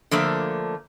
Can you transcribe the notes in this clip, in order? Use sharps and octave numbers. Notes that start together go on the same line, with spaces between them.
D3 F3 A3 A#3